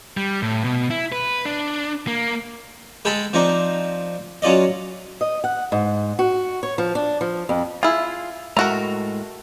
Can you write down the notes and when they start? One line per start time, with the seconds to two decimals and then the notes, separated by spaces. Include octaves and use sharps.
0.17 G3
0.42 A2
0.64 B2
0.90 E4
1.12 B4
1.45 D4
2.07 A#3
3.05 G#3 G#4 A4 G5 A5 B5
3.33 F3 C4 D4 D#4
4.42 F#3 C#4 F4 D5 D#5
5.21 D#5
5.44 F#5
5.72 G#2
6.19 F#4
6.63 C#5
6.78 F3
6.95 D4
7.21 F3
7.49 F2
7.83 E4 F4 G#4
8.57 A2 G#3 A3 F#4 A#4 A#5